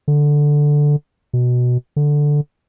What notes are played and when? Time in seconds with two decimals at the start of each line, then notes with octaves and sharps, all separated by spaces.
0.08 D3
1.33 B2
1.96 D3